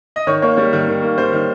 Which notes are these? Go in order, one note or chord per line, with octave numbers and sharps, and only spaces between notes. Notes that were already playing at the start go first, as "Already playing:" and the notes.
D#5
D#3 C#5
A#3 C#5
G3 C#5
D#3
D#3
A#3
G3 C5
D#3